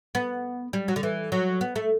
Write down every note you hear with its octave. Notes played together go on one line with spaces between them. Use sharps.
B3
G3
F#3
D3
E3
F#3
B3
A3